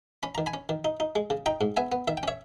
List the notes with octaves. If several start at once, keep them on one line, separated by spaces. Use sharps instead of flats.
C#4 B5
D#3 A#5
G#5 B5
C#4
D#3
D#4
D#4
G#3
C#3
D#4 G5 A#5
G#2
B3 E5 G#5
B3
D#3 E5
G5
C#4 C#5 E5